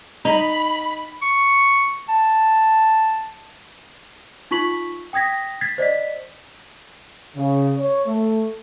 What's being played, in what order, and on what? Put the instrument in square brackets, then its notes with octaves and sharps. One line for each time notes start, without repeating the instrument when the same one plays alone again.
[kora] D#4 [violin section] B5
[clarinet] C#6
A5
[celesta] D#4 F4 C#6 B6 F#7
G5 D#6 G#6 A#6 B6
G#6 A6 B6 C7
C5 D5 D#5 B6
[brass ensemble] C#3
C#5
A3